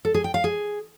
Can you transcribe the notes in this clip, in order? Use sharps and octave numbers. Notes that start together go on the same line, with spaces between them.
A4
G#4
G5
F5
G#4